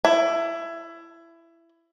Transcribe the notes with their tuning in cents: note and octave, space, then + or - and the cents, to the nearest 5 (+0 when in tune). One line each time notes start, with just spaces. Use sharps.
E4 +20